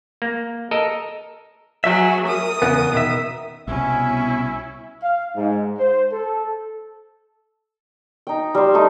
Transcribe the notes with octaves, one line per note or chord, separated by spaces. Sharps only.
A#3
A4 A#4 D#5
F#3 G#4 E5
A#4 D#6
E2 C#3 B3
B2 D#3 E5
C2 B2 B3 C#4 E4 E5
F5
G#2
C5
A4
D#4 G5
G3 C5
A3 D#4 E4